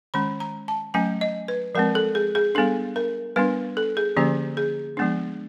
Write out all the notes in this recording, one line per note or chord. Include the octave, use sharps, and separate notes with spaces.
D#3 G#3 C#4 B5
A#5
A5
F#3 A3 C#4 G#5
D#5
B4
F3 G#3 C4 A#4
A4
G#4
G#4
G3 B3 D4 A4
A#4
G3 B3 D4 B4
A4
G#4
D3 F3 A#3 C#4 G4
G#4
F3 G#3 B3 D4